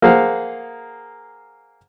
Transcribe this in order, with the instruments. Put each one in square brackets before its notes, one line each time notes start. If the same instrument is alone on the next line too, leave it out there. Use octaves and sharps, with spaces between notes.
[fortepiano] A#3 G#4 C5 F5 F#5